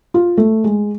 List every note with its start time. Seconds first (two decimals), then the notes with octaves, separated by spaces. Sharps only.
0.14 F4
0.38 A3
0.64 G#3